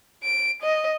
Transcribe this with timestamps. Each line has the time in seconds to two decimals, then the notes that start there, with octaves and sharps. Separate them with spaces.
0.23 D7
0.62 D#5